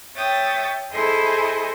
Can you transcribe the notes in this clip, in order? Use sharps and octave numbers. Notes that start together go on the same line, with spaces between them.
C#5 E5 G5 D#6 A6
E4 G#4 A4 C5 D#5 G#5